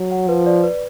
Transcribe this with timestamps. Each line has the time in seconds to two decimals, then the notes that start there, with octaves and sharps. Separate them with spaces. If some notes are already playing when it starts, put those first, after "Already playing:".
Already playing: F#3
0.11 F#5
0.28 F3 B4
0.46 D5
0.63 B4